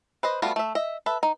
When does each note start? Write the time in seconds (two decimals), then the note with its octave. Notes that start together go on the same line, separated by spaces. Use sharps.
0.23 B4 C5 D#5
0.42 G3 A3 B3 F4 F#4
0.56 A3 E5
0.75 D#5 E5
1.06 A4 B4 E5
1.23 D#4